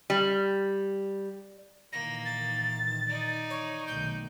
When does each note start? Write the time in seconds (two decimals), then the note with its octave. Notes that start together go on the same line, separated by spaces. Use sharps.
0.10 G3
1.93 A#2 D#3 E3 A#3 A#6
2.25 A6
3.07 D#4 D5
3.50 C#5
3.87 B1 D#3 A3 G6